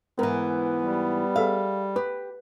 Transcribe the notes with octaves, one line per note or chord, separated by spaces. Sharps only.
G#2 E3 B3 A#4
G3
G#4 A4 E5 F5
G4 B4